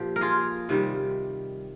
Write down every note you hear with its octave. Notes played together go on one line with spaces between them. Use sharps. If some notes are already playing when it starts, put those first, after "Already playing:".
Already playing: A#2 F3 G4
A#4
F4 G#4
C3 D#3 G3